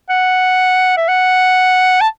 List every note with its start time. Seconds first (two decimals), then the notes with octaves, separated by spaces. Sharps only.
0.09 F#5
0.97 E5
1.09 F#5
2.01 A5